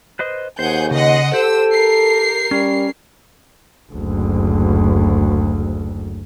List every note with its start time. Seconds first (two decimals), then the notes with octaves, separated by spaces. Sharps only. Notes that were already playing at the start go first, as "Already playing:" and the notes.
0.19 B4 C5 D#5
0.59 D#2 G#4 C5 F#5 G6
0.91 C#3 D#5 F#5 C6
1.34 G4 A4 C5 E6
1.69 A#4 C7
2.51 G3 C#4
3.92 F#1 D2